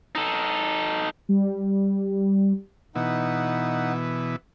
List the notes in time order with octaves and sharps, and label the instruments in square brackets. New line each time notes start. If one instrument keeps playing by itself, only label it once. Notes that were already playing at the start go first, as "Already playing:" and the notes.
[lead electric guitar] D#4 A4
[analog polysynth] G3
[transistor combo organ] B2 E3 [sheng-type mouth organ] D#4 F#5